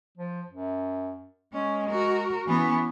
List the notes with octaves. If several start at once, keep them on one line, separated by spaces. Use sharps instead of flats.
F3
F#2
G#3 C#4
F#4 A#4
E3 B3 C#4